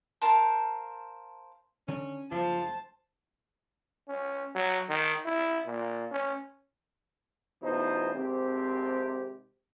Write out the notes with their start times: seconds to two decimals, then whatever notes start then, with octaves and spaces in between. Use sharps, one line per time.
0.22 A#4 C5 F5 A5
1.88 D3 D#3 C#4 D4
2.31 F#1 F3 C5 A5
4.08 C#4
4.55 F#3
4.89 D#3
5.25 E4
5.66 A#2
6.11 C#4
7.63 A1 E2 B2 D#4 F4 C5
8.15 G#1 C3 C4 G4